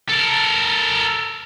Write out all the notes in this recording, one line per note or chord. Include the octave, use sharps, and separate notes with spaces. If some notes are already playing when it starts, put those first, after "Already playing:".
A4 A#4